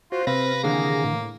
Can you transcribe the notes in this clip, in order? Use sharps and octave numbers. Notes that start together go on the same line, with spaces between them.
F4 F#4 C5
C3 C4 B4 F5 A#6
D#2 D3 E3 A#3 G#4
A2